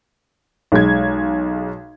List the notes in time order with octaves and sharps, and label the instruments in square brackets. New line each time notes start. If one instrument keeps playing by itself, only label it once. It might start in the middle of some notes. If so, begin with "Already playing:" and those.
[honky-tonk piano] B1 G#3 G#6